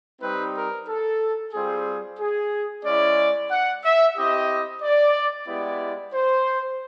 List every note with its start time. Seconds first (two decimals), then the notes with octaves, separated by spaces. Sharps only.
0.21 G3 C4 D#4 G4 B4
0.55 A#4
0.88 A4
1.53 G3 C4 F4 G#4
2.19 G#4
2.84 G#3 C#4 E4 D5
3.50 F#5
3.84 E5
4.17 C4 E4 G4 D#5
4.82 D5
5.47 G#3 B3 E4 G4 D5
6.13 C5